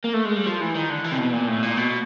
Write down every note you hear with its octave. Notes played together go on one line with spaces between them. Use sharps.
A#3
A3
G#3
G3
F3
E3
D#3
D3
E3
C3
B2
A#2
A2
A#2
B2